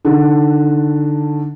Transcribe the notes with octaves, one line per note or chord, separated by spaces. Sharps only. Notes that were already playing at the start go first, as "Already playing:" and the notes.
D3 D#3 D4